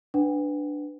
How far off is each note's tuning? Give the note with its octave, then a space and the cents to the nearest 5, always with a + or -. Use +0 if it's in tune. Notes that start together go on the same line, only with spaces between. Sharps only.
D4 +5 B4 +15 F#5 +25